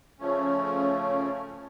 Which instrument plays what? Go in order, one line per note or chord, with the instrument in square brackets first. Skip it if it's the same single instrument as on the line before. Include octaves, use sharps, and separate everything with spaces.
[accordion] C#3 F3 A3 C#4